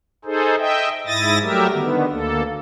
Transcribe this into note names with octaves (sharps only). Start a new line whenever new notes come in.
D#4 G#4 A4 C5
D#5 E5 G5
G#2 E4 D#6 A6 A#6
F#3 G3 A3 G4 A#4 E5
D3 D#3 B3
D2 A#3 A4